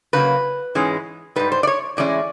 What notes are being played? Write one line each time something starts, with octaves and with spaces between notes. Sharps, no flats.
C#3 F#3 A#3 B4
G#2 E3 G#3 C#4
G#2 D#3 G3 B4
C5
D5
C#5
A2 E3 G#3 C#4 D5